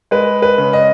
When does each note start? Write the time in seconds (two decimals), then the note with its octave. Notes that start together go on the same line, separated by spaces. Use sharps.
0.11 G#3 B4
0.42 B4
0.58 C#3
0.73 D#5